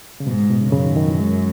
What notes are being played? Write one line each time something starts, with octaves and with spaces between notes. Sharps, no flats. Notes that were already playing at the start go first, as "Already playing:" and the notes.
C#3
G#2 B2
A2
B2
C#3
F#2 C#3
D#3
D#3
E3
G#3